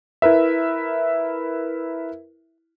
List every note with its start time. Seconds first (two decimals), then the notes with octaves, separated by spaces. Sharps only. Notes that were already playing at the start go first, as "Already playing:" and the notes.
0.22 E4 A#4 B4 E5